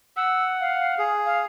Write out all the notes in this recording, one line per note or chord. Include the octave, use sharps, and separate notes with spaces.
F#5 E6
F5
G#4
F5